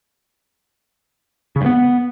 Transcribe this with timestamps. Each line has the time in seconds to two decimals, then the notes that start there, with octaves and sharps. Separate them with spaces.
1.56 C#3
1.61 G2
1.66 B3